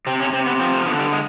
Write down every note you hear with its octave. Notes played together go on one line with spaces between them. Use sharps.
C3 C4
C#4
C3 C4
B3
F3 C4
C4
D3 B3
G3
G#3